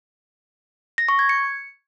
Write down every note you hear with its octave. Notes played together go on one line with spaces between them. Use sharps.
A#6
C#6
G#6
C#7